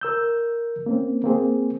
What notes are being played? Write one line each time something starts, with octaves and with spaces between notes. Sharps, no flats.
A#4 E6 G6
A#3 C4 C#4
A#3 C4 G#4